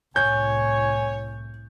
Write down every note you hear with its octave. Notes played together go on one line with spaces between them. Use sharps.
C2 A2 C#5 G#5 G6